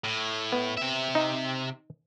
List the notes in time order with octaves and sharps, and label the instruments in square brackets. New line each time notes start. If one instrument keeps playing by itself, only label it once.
[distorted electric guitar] A2
[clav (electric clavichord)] B3
[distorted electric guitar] C3 E5
[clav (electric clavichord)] D#4